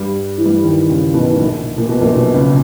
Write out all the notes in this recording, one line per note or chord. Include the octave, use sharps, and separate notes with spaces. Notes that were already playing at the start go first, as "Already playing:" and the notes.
Already playing: G2 G3
E3
G2 G3
D#2 D#3
C#2 C#3
B1 B2
G#2
A#1 A#2
A#2
B2
A#1 A#2
B1 B2
C#2 C#3